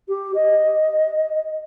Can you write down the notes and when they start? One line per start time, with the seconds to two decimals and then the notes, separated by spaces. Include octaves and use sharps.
0.08 G4
0.34 D#5